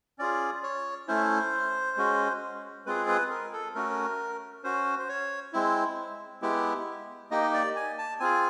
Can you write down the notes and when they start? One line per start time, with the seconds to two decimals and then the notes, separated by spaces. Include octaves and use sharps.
0.19 C#4 F4 G#4 D5
0.63 C#5
1.08 A3 C#4 E4 C5
1.97 G#3 C#4 F#4
2.86 G#3 C4 F4 G#4 B4
3.08 B4
3.30 A#4
3.53 A4
3.75 A3 C#4 F#4 A#4
4.64 C#4 F#4 C5
4.99 C5
5.09 C#5
5.53 G#3 C4 E4
6.42 G#3 B3 E4 G4
7.31 A#3 D#4 G4 D#5
7.54 D5
7.76 G#5
7.98 A5
8.20 C4 F4 G#4 G#5